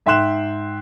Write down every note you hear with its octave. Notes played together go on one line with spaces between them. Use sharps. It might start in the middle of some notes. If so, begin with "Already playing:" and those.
G#2 E5 G5 C6 F#6 E7